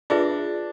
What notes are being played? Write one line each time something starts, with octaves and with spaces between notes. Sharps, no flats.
D4 F4 G#4 B4 E5